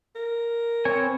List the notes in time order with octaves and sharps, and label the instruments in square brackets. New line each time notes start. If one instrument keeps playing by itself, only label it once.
[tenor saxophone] A#4
[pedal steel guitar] C4 C#5 G#5
[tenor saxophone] B4